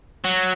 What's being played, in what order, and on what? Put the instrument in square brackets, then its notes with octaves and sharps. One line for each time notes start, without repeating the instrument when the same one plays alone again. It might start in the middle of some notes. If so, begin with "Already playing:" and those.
[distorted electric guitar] F#3